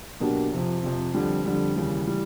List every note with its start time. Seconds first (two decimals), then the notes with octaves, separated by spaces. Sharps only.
0.20 B2 F#3 A#3 D4 G4
0.51 F2 C3 F3
0.82 F2 C3 F3
1.14 F2 D3 G3
1.45 F2 D3 G3
1.76 D#2 C#3 E3 G3
2.07 E3 G3